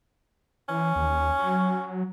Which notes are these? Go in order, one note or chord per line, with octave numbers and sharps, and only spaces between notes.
E3 C#4
D#2
F#3